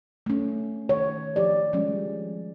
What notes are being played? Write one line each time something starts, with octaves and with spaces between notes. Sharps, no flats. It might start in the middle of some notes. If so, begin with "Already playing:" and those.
A3 C#4
D#3 C#5
F3 G4 D5
F3 G3 G#3 C#4